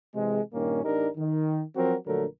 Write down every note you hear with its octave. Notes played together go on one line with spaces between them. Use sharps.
C3 E3 G#3
G2 A#2 D#3 A#3 C#4
A1 D4 D#4 G4 A#4
D#3
F3 F#3 C4 F#4 A#4
A#1 D3 F#3 A3 A#4